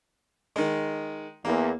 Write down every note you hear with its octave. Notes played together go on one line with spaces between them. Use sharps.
D#3 G#3
E2 A#3